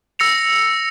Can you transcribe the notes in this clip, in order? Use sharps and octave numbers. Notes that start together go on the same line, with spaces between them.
E6 A#6 C#7 F7